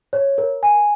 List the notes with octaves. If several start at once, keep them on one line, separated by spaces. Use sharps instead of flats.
C#5
A#4
G#5